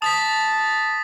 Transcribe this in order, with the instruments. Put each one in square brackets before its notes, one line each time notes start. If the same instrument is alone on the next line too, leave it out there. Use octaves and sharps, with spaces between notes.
[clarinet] A5 [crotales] D#6 A6 B6